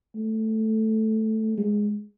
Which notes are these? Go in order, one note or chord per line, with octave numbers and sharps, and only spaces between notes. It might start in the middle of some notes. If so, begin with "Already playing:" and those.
A3
G#3